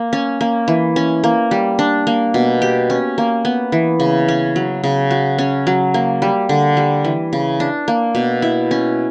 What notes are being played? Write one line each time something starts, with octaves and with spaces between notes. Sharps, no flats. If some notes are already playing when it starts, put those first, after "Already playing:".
Already playing: A#3
C#4
A#3
E3
C#4
A#3
G3
D4
A#3
B2
G4
C#4
A#3
B3
E3
C#3
C#4
F#3
C#3
F#4
C#4
F#3
A#3
G3
D3
G3
E3
C#3
D4
A#3
B2
E4
C#4